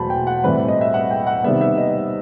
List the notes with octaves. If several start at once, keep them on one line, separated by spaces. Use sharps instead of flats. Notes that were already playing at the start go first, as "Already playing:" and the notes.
Already playing: E2 B2 F#3 A3 C5 A5 B5
G5
F#5
A2 E3 G3 C4 B4
D#5
E5
F#5
G5
F#5
C3 D#3 G3 B3 E5
E5
D#5